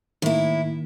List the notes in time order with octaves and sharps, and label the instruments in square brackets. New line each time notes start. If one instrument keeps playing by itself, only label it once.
[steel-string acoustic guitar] A2 E4 [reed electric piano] D#3 A#3